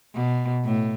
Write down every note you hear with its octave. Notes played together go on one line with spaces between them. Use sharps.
B2
A2